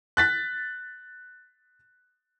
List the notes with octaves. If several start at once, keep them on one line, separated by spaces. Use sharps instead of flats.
F#6 A6 B6